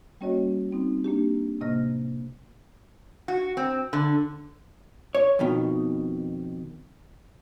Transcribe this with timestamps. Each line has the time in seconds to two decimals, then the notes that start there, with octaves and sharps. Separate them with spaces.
0.21 G3 A#3 C#4 F#4 C#5 D#5
0.71 G3 C4 D#4
1.04 A#3 D4 G4
1.61 A2 C3 A#3 D#5 F6 A#6
3.28 F#4
3.57 C4
3.93 D3
5.15 C#5
5.39 F2 B2 D#3